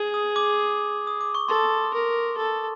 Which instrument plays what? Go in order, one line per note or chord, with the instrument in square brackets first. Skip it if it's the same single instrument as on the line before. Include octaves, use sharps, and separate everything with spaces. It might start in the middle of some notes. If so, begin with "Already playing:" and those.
Already playing: [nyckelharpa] G#4
[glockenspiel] D#6
D6
D#6
D6
C#6
[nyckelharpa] A4 [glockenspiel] C6
[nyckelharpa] A#4
A4